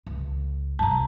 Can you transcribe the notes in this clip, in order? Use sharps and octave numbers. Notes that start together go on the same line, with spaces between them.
C#2
G2 C3 A5 A#5